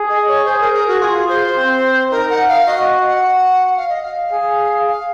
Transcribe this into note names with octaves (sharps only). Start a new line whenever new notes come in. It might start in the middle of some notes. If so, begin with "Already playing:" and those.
Already playing: G#4
D#5
C#5
G#4 C5
A#4
A#4
F#4
F4 G#4
C5
C4
D#4 A#4
F#5
F5
F#4 D#5
D#5
F#5
F#4
F5
D#5
F5
G#4
F5